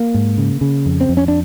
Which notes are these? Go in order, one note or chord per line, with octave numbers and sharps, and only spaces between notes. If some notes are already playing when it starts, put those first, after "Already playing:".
Already playing: A#3
G#2
C#3
C#3
F2
C4
F2
C#4
D4